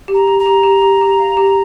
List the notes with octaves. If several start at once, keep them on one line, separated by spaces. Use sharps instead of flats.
G4
A#5
G4
A#5
G4
G4
G4
G4
F5
G4